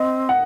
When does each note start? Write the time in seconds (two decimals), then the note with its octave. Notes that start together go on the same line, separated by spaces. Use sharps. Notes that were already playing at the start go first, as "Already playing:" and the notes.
Already playing: C4 D#5
0.29 F#5